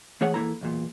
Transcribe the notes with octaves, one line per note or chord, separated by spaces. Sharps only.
E3 A3 G#4 C#5 F#5
E2 A#3 E4 A4 A#5
B1 E2 A#2